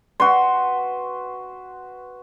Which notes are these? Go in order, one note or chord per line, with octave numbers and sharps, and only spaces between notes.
F#4 B4 C6